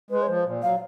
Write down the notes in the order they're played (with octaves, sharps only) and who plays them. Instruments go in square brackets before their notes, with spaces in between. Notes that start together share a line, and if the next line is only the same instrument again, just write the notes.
[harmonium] G#3 [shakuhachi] B4
[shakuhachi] C#5
[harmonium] F3 [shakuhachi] C5
[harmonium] A#2
[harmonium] F#3 [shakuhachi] F5